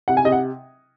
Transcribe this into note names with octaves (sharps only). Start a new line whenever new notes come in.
C3 F#5
G#5
C3 D#5
F#5